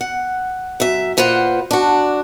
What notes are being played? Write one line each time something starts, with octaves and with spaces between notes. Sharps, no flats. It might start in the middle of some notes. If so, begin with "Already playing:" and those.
F#5
F#2 E5
A#2 F4 B4 C5 F#5
D4 F#4